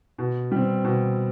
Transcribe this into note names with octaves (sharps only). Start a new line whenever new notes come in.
B2
G3 C4
B2